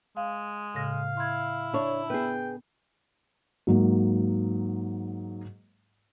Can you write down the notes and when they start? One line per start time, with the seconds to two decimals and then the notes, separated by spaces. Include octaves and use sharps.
0.17 G#3 F5
0.74 A2 C#3 F5 A#6
1.17 E4 C6 G#6
1.73 D4 C#5 E5
2.10 B3 G#4 B4 G5
3.67 G#2 F#3 A#3